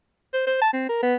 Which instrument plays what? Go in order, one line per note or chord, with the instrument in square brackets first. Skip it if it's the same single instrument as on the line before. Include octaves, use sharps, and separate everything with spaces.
[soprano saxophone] C5
C5
A5
C4
A#4
B3